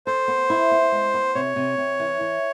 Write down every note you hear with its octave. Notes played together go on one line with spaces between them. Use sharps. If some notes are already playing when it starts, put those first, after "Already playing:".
A4 C5
B3
E4
B3
G#3
B3
C3 C#5
C3
C3
E3
E3